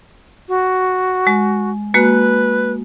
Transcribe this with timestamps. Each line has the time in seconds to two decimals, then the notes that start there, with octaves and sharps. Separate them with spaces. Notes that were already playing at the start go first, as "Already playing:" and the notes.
0.48 F#4
1.27 G#3
1.94 G#3 A#3 F#4 B4